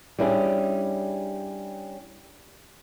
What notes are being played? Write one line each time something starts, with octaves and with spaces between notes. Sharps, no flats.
G3 C#4 D4 E4 G#4